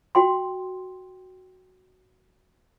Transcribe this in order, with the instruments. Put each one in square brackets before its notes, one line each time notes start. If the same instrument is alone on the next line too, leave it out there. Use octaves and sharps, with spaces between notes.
[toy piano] F#4 G5 C6